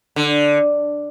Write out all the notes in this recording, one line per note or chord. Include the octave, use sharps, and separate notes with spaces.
D3